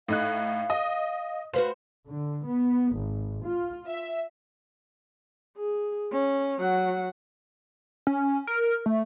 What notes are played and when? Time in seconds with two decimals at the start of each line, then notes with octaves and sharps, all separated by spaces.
0.08 A2 D#4 F5 F#6
0.70 D#5
1.54 F#4 B4 C5 F5
2.10 D3
2.46 B3
2.96 G#1
3.44 F4
3.87 E5
5.57 G#4
6.12 C#4
6.60 F#3 F#5
8.07 C#4
8.47 A#4
8.86 A3